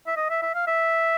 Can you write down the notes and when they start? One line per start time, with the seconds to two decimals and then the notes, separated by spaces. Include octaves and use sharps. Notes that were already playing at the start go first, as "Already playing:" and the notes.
0.07 E5
0.16 D#5
0.30 E5
0.42 E5
0.54 F5
0.67 E5